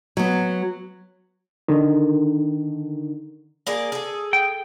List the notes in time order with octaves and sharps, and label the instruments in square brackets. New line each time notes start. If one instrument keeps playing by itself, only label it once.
[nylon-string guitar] F#3 B3
[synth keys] D3 D#3
[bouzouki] A#3 G#4 D5
G#4 A4
[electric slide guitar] G5